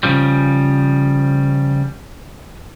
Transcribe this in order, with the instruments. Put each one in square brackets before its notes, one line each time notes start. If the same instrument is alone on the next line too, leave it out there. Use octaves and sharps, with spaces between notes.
[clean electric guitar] C#3 F3 G3